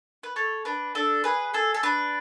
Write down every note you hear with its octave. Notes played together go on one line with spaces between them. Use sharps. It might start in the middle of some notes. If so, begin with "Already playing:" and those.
B4
A4 C#5
D4 B4
D4 A4
G#4 B4
G#4 A4
A4
D4 B4